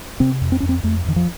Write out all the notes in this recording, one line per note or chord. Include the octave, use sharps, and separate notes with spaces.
C3 C4
F2
C4
F2 C#4
C4
F2 A3
F2 D#3
F3